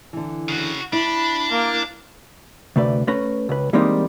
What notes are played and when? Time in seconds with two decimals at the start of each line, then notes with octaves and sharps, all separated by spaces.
0.13 D3 E3
0.49 C#3 F#4
0.93 D4 E4 B5
1.51 A#3
2.76 D2 C3 A3 B4 D5
3.07 A3 C#4 B4 A#5
3.49 C#2 B4
3.73 E3 G3 G#3 A#3 C4 D#4